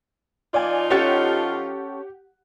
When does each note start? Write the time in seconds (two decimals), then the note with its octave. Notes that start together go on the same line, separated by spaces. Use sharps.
0.54 F3 D#4 F4 D5 G#5
0.90 C#4 G4 A4 C#5 F#5